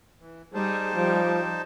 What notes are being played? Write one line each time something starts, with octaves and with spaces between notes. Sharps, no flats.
E3
G3 D#4 G#4 C5 A5
F3 G3